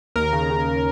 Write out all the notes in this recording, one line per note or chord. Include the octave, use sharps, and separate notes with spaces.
D#2 A#4
C#3
C#3